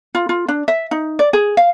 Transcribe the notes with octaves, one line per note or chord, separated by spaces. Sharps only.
F4
F4
D4
E5
D#4
D5
G#4
F5